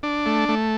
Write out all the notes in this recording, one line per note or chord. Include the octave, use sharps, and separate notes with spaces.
D4
A3
A3